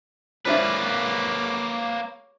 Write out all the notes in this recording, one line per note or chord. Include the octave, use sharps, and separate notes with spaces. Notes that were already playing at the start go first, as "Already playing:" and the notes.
F3 A#3 D4 E4 B4 C#5 D6